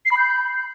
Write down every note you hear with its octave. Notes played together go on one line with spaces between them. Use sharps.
C7
B5
G6